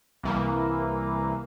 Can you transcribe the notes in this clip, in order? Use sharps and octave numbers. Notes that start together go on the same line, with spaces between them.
C2 E3 A#3